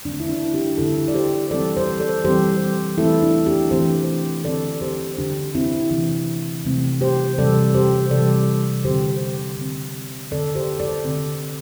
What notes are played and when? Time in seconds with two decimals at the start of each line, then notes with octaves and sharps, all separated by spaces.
0.05 D3 A3 C4 D4
0.20 E4
0.29 D4
0.54 D4 G4
0.78 D3 A3 C4 E4 A4
1.08 D5
1.15 G4 C5
1.51 E3 G3 C4 A4 D5
1.76 G4 C5
2.00 A4 D5
2.24 E3 G3 C4 G4 C5
2.98 E3 A3 C4 E4 A4
3.22 D4
3.46 D4 G4
3.71 E3 A3 C4 G4 C5
4.44 D3 C4 A4 D5
4.81 G4 C5
5.18 D3 C4 D4 G4
5.55 C4 E4
5.91 C3 E3 A3 C4
6.65 C3 E3 A3 C4
7.01 G4 C5
7.38 C3 E3 G3 A4 D5
7.74 G4 C5
8.11 C3 E3 G3 A4 D5
8.85 D3 C4 G4 C5
9.57 D3 C4
10.31 D3 C4 A4 D5
10.55 G4 C5
10.80 A4 D5
11.05 D3 C4